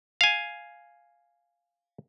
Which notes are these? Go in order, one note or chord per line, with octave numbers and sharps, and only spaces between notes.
F5 G#5